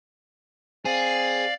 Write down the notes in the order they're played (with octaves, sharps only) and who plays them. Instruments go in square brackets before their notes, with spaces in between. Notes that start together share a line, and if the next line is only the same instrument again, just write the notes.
[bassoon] C4 [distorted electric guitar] G#4 [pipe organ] D5 F5